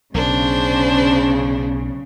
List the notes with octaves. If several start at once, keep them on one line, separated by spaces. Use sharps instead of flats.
B1 C#3 D4 C5